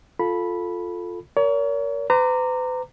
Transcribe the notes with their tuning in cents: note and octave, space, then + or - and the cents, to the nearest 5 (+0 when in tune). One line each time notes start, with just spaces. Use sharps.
F4 +10 A4 +0 B5 -10
A#4 +0 C#5 +40
B4 +40 A#5 -20 D6 +5